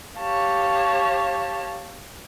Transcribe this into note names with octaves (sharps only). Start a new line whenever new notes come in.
G4 C#5 F5 A5